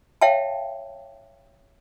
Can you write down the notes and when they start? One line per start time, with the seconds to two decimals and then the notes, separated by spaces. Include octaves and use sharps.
0.21 C#5 E5 F5 G5 A5